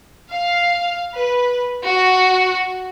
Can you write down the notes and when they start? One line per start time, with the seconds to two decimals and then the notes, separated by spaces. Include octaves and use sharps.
0.33 F5
1.15 B4
1.85 F#4